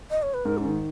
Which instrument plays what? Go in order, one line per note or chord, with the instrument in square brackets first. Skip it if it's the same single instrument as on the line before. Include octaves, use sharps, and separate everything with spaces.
[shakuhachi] D#5
C#5
B4
[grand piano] G#2 [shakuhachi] A#4
[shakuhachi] C#4
[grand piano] D#3